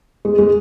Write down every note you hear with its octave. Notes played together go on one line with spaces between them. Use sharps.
G#3
G#3